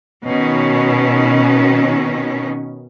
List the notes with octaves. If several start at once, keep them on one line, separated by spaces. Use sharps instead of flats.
B2 D#3 C#4